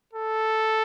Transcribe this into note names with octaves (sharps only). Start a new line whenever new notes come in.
A4